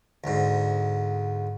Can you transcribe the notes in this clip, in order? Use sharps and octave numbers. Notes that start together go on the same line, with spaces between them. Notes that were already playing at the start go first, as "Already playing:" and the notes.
D2 G#2